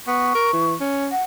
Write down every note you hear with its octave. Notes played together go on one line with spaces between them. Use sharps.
B3 C#6
A#4
E3
C#4
F#5